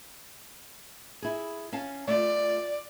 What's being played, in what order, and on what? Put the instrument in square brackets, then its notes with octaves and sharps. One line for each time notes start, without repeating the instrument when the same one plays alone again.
[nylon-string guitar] E4 G#4
C#4 F5 A5
[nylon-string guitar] A3 F4 [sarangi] D5